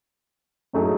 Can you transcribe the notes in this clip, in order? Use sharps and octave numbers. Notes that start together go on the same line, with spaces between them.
A2 F#3 A3 D#4 G#4